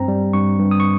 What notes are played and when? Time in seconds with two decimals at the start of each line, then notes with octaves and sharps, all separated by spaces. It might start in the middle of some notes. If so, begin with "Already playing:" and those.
Already playing: G2 C4 A#5
0.08 G3
0.33 G2 C#6
0.59 G2
0.71 D#6
0.80 C#6